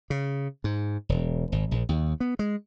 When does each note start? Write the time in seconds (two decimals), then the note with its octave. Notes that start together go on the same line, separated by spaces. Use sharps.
0.10 C#3
0.64 G#2
1.09 E1
1.52 G#1
1.71 A#1
1.89 D#2
2.20 B3
2.39 G#3